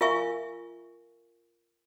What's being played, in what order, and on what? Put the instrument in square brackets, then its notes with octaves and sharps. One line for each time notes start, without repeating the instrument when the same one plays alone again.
[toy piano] F4 A#4 E5 F5 G#5 C#6